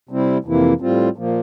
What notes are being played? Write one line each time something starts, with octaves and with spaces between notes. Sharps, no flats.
C3 G3 C4 E4
F2 C3 E3 A#3 E4
A2 G3 C4 F4
A#2 F3 A#3